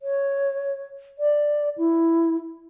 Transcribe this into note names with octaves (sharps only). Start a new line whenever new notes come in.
C#5
D5
E4